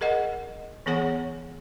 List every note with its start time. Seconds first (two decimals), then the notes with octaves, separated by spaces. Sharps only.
0.01 G#4 A#4 D#5 F#5
0.86 E3 B3 G#4 C#5 F#5